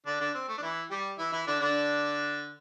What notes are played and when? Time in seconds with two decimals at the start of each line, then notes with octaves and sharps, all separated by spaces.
0.06 D3 D4
0.20 D3 D4
0.35 C4
0.49 A3
0.58 D4
0.62 E3 E4
0.90 G3 G4
1.19 E3 E4
1.33 E3 E4
1.47 D3 D4
1.60 D3 D4